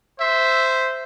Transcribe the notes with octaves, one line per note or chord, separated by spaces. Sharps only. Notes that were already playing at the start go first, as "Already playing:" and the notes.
C5 E5